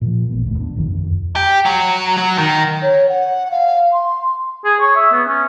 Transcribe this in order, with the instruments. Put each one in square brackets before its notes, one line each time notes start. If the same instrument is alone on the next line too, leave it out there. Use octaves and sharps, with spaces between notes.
[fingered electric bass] A#2 F3
A1 A2 B3
E1 D2 A2
B3 D4
G1 C2 F2 D#3
D1 F2
[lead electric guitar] G4
F#3
F#3
D#3
[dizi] C#5
F#5
F5
C6
[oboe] G#4
C#5
E5
B3
C#4